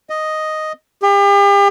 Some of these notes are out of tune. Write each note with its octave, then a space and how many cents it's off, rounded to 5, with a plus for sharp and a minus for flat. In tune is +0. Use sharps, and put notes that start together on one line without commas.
D#5 +0
G4 +40